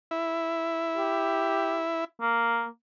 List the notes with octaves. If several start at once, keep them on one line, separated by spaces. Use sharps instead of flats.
E4
G4
A#3